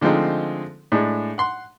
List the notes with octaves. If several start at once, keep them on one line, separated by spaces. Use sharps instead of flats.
D3 F3 G#3 A3 C4 D#4
A2 G#3 D4
F#5 C6